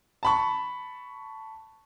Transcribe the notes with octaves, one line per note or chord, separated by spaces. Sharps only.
A5 B5 C#6